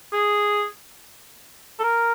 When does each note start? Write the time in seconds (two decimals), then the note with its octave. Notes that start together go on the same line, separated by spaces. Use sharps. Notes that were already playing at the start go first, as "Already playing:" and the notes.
0.13 G#4
1.79 A4
1.83 A#4